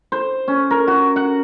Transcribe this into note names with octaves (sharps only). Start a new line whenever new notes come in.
C5
C#4
A#4
F#4
F#5